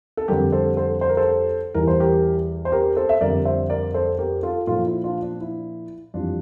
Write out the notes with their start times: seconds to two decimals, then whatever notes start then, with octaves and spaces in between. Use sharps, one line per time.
0.17 A4
0.28 F2 D3 G3 G4 A#4
0.52 A4 C5
0.77 A4 C5
1.01 C5
1.09 A#4
1.17 A4 C5
1.74 E2 E3 G3 A#4
1.88 C5
2.00 G4 A#4
2.65 C5
2.72 G4 A#4
2.96 A4 C5
3.09 E5
3.21 F2 D3 G3 A#4 D5
3.45 C5 E5
3.70 A#4 D5
3.94 A4 C5
4.18 G4 A#4
4.43 F4 A4
4.67 A#2 F3 F4 A4
4.86 E4
5.04 D4 F4
5.22 D4
5.41 E4
6.14 F2 E3 G3 D4 F4